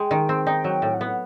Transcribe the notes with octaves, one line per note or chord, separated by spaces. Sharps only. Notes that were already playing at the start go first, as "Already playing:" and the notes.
Already playing: G#3 G5
D#3
C4
D#4 G5
F#3
G5
A2
F#5
B3